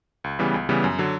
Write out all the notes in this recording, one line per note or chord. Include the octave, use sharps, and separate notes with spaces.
C#2
C#3 E3 G3 B3
C#2
C#3 E3 G3 B3
F#2
D3 F#3